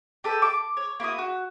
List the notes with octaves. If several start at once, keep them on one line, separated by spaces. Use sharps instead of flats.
G4 A4 B4
D6
C#5
A#3 E4 F#4 D#6
F#4